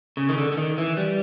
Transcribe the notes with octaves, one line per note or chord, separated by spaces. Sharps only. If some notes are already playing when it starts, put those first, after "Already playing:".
C#3
D#3
D3
D3
D#3
E3
G3